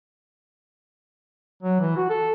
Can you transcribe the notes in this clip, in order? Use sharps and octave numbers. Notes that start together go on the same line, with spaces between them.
F#3
E3
F#4
A4